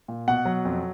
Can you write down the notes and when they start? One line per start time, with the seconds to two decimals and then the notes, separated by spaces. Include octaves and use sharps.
0.08 A#2
0.28 B2 F#5
0.45 F#3
0.65 F2